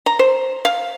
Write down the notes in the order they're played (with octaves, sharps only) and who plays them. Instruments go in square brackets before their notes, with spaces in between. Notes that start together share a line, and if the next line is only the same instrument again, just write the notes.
[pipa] A#5
C5
F5